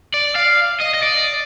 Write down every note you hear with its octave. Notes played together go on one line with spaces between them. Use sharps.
D5
F5
D#5
D#5
D5